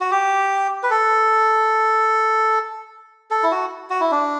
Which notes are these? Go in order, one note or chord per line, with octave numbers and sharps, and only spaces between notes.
F#4
G4
B4
A4
A4
E4
F#4
F#4
E4
D4